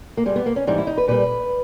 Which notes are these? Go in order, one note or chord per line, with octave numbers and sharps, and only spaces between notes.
A#3
G2 G3 G#3
B3
A#3
C#4
G#2 E3 G3 D#4
E4
D#4
B4
A#2 G3 B4